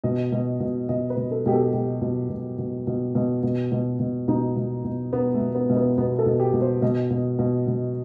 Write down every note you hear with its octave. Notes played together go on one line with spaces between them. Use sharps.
B2 D#5
B2
B2
B2 D#5
B4
B2
A4
B2 G4
A4
B2 G4
B2
B2
B2
B2
B2
B2
B2
B2
B2 D#4
B2
B2
B2 B3
A3
B2
B3
B2
B3
B2 B3
A4
B2
G4
B2
C5
B2 D#5
B2
B2
B2